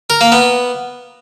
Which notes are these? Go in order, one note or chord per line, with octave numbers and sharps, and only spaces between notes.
A#4
A#3
B3